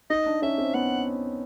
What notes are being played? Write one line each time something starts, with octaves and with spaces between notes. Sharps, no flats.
D#4 D#5
D4
C#4 E5
C4
B3 F#5